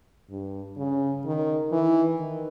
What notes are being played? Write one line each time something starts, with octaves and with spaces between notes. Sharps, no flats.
G2
C#3
D#3
E3
D#3